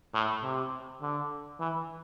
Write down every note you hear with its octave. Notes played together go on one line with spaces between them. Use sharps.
A2
C3
D3
E3